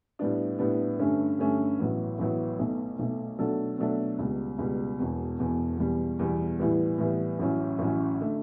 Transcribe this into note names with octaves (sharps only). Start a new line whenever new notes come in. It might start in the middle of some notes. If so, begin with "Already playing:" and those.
A2 G3 B3 D4
A2 G3 B3 D4
G2 D3 A3 C#4
G2 D3 A3 C#4
A1 A2 F#3 B3
A1 A2 F#3 B3
B1 B2 A3
B1 B2 A3
B2 F#3 A3 D4 A4
B2 F#3 A3 D4 A4
C#2 B2 G3
C#2 B2 G3
E1 E2 B2
E1 E2 B2
E2 B2 G3
E2 B2 G3
A2 E3 G3 B3
A2 E3 G3 B3
A1 A2 F#3 C#4
A1 A2 F#3 C#4
D3 A3